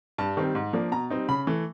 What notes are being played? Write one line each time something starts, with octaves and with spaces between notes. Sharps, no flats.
G2 A5
D#3 G3 C4
G#2
F3 A#3 D4
B2 A#5
G3 C4 D#4
C#3 B5
E3 A3